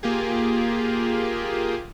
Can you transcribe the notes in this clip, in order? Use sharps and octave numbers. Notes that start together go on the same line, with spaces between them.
A#3 F4 G4 G#4